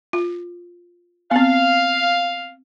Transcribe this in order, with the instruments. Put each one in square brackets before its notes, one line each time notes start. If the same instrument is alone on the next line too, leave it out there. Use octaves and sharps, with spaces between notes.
[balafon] F4
[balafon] B3 C4 [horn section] F5